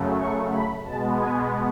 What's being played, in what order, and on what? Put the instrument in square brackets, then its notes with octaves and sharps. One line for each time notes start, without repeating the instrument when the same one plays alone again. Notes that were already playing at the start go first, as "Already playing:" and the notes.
Already playing: [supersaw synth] F#2 C#3 F#3 A3
C#6
B5
B2 G#3 B3 A5
G#5